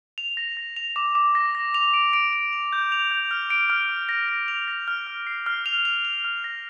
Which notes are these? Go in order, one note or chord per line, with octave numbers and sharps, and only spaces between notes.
F7
A#6
A#6
F7
D6
D6
A#6
A#6
F7
D7
D7
D7
F7
G6
F7
G6
F6
D7
F6
F6
A#6
A#6
F7
A#6
F6
F6
C7
F6
F7
F7
F7
F6
A#6